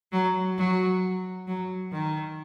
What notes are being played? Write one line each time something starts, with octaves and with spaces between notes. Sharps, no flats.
F#3
F#3
F#3
D#3